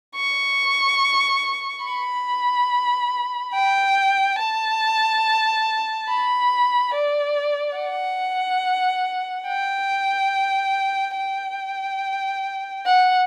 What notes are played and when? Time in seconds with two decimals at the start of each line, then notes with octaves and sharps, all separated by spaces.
0.16 C#6
1.85 B5
3.54 G5
4.39 A5
6.08 B5
6.94 D5
7.78 F#5
9.47 G5
11.17 G5
12.86 F#5